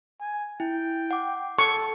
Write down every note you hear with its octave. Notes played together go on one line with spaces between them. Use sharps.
G#5
E4 G5
F#5 D6
A4 C#6